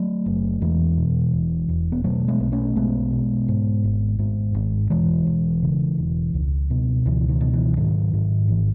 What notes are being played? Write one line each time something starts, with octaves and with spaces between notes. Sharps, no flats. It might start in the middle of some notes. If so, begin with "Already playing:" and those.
Already playing: F#3 A3
F#1
E2 E3 G#3
B2
E1
E1
B3
B2 F#3 A3
G#3 B3
B1
A3 C#4
B1 G#3 B3
B2
G#2
G#1
G#2
G#1
E1 E3 G#3
E1
C#3
E1
C#2
B2
C#2 E3
D#3
B2
E3
G#2 D#3 F#3
G#2
G#1 E3
D#3